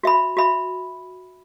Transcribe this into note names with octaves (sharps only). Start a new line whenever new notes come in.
F#4 E5 B5
F#4 E5 B5